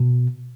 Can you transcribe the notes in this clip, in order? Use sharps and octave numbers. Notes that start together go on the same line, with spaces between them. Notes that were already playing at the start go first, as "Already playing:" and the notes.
Already playing: B2